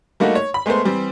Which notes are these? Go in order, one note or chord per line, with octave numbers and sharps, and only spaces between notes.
G3 A3 A#3 D#4 F#4
C#5
B5
G#3 A3 B3 A#4 C5
E3 G3 C4